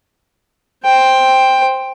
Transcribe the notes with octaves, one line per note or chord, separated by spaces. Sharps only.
C5 G5